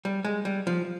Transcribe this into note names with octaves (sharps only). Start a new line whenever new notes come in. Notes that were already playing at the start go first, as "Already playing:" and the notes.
G3
G#3
G3
F3